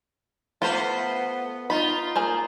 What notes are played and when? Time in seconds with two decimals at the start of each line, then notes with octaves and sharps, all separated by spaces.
0.62 A3 B3 F4 B4 C5
1.70 D#4 F4 B5
2.16 A#3 G#4 C5